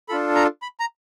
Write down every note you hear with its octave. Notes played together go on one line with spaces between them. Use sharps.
D4 F4 A4 B5
A#5
B5
A#5